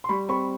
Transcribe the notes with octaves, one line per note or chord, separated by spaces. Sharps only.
C6
G3 B5 C#6
C4 B5 C#6